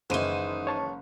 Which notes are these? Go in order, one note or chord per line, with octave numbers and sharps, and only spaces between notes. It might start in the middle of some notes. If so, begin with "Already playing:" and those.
F#1 D#3 E3 G#3 D#4 C5 D#7
C#5 A5 C#6